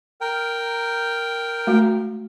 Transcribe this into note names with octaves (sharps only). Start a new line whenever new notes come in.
A#4 G5
G#3 A3 F#4